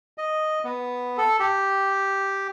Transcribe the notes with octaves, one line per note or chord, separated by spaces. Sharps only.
D#5
B3
A4
G4